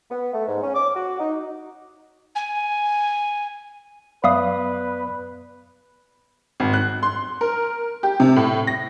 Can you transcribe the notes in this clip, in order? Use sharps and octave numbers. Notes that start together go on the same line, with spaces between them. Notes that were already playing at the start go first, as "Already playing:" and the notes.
B3
A3
G#2
C#4
D6
F#4
D#4
G#5
F#2 B3 B4 D5 E5 F5 D#6
G#1
F#6
C6
A#4
G4
C3
A2
A#6